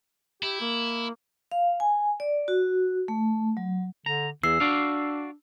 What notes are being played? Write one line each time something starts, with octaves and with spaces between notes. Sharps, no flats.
E4 G4
A#3
F5
G#5
D5
F#4
A3
F#3
D3 A#5
E2 E3 E6 C7
D4 F#4 D5 F5